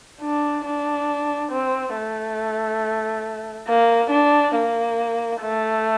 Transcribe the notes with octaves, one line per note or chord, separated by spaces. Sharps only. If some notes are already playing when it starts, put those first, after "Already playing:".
D4
D4
C4
A3
A#3
D4
A#3
A3